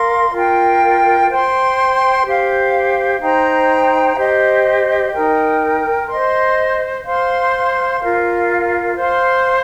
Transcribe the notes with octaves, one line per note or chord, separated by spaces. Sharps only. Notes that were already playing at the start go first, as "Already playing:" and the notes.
Already playing: A#4 F5 C6
F4 A#4 G5
C5 G5 C6
G4 C5 F5
D#4 C5 G5 A#5
G4 C5 D#5
D#4 A#4 G5
C5 D#5 C6
C5 F5 C6
F4 A#4 F5
C5 F5 C6